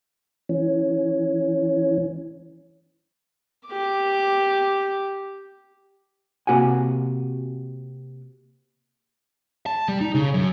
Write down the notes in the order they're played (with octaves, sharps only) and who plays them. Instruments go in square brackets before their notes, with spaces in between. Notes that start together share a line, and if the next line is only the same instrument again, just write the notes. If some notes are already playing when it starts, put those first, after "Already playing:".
[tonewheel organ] E3 C#4
[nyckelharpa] G4 D6
[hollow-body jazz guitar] C3 A#3 F#4 F#5 G#5
[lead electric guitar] A5
G3
D#4
C#3
F#2